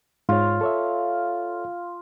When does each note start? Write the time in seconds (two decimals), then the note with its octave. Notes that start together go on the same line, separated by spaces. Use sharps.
0.29 G#2 F4 C#5
0.61 A4 C#5 E5